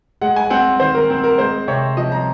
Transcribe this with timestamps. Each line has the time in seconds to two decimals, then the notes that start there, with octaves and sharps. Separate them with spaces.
0.21 G#3 F#5
0.36 G#5
0.50 C4 F#5
0.80 D#3 C5
0.95 A#4
1.10 C4
1.24 A#4
1.38 G#3 C5
1.68 C3 C#5
1.97 F3 D#5
2.12 A#5